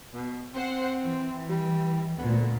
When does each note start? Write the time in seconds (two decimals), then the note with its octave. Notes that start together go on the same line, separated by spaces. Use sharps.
0.14 B2
0.54 C4 C5 F#5
1.02 E3
1.49 G3
2.18 D2 A#2 B3